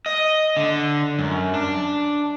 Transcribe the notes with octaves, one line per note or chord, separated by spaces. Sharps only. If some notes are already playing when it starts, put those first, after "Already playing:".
D#5
D3
F#2
D4